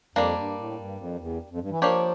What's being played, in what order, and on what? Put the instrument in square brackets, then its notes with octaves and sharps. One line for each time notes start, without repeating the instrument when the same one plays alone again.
[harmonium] F2 [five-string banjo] G3 A#3 D4
[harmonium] G2
A2
G2
F2
E2
F2
G2
E3
[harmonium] F3 [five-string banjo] A#3 D4 G4 C#5